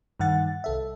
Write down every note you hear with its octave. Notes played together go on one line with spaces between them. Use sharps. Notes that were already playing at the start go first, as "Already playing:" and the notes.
G2 D#3 F#5 A6
C2 A4 E5